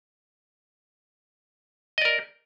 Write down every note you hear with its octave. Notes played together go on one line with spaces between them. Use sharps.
A#4 D5 D#5